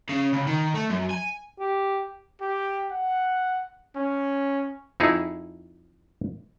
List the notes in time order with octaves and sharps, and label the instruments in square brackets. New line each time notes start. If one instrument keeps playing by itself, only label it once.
[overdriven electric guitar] C#3
C#2
D#3
A3
F#2
G#5
[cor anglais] G4
[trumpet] G4
F#5
C#4
[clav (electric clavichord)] F2 D#4 E4 G#4